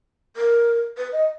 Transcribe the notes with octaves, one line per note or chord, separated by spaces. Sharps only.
A#4
B4
D#5